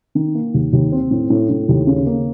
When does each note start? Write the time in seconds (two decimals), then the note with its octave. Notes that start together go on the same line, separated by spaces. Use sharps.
0.15 D#3
0.35 A#3
0.54 D#2
0.73 D#2
0.92 C4
1.11 A2
1.30 A2
1.49 A2
1.69 D#2
1.87 C#3
2.06 A#3